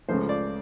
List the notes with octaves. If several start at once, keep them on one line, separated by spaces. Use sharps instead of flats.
C#2 C#3 F3 A3 C5
D5